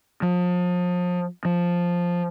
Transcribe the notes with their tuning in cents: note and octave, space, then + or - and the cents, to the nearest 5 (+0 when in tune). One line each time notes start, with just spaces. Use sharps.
F3 +35
F3 +5